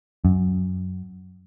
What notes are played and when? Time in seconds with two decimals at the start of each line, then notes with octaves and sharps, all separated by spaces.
0.25 F#2